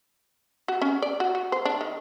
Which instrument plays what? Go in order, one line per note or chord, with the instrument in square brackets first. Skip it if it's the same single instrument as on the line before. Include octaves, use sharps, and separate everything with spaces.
[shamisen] F#4
C#4
D5
F#4
F#4
C5
D4
D#3